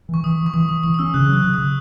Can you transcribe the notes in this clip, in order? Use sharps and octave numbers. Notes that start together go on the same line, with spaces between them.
E3
C#6
E3 D#6
E3
C#6
E3 D#6
E3 D#6
E3 D#6
D#6
C#4 E6
C#3 F#6
F#3
F#6
C#3
D#6
C#3